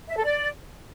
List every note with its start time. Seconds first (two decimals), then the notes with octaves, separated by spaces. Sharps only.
0.08 E5
0.17 A4
0.25 D5